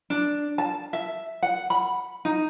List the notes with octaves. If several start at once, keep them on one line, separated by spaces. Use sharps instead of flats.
D4
A5
E5
F#5
B5
D#4